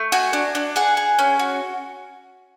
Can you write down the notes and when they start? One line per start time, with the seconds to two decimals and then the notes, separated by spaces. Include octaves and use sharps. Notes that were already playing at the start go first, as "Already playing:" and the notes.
Already playing: A3
0.12 F#4 G#5
0.33 D4
0.55 D4
0.76 G#4 F#5
0.97 G#4
1.19 C#4
1.39 F#4